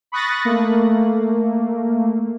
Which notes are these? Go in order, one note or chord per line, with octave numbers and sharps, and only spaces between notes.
B5 C#6 D#6 F#6 A6 A#6
A3 A#3